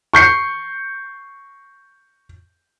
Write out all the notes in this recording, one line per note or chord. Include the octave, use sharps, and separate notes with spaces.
C#6 G6 C7 C#7